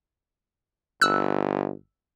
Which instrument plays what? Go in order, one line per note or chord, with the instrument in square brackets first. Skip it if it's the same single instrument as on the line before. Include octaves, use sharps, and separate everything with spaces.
[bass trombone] G1 [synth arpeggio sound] E6 F#6